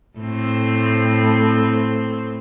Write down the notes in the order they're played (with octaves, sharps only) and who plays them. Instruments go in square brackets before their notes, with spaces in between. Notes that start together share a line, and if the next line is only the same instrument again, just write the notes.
[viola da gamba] A2 C4